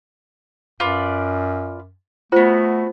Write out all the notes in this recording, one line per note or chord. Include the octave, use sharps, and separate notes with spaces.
F#2 F4 B4 D5
A3 B3 F4 F#4 C5